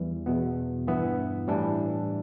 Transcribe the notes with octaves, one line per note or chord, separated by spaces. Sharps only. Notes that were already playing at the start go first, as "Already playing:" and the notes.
Already playing: E2 E3 G3
E2 B2 B3
G2 E3 B3 E4
A2 E3 G3 D4